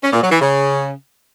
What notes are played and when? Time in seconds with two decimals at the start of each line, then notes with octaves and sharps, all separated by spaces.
0.03 C#4
0.12 A#2
0.22 F#3
0.32 E3
0.41 C#3